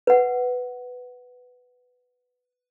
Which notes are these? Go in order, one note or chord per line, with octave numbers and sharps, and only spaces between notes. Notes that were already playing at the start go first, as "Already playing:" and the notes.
B4 F#5